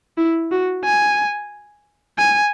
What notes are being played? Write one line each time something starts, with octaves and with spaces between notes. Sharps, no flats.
E4
F#4
G#5
G#5